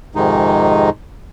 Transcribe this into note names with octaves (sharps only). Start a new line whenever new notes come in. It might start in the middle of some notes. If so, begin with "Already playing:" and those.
F2 G#2 C3 D#3 G#3 D#4